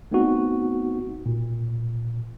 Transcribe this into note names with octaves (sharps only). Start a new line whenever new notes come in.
A3 B3 C4 D#4 F#4
A#2